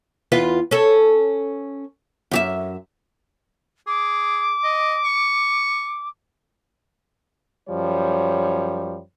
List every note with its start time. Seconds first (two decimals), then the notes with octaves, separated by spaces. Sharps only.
0.32 E2 F4 B4
0.71 C#4 A4
2.31 F#2 G4 E5
3.87 G#4 D6
4.64 D#5
5.04 C#6
7.69 F#2 F3 G3 C#5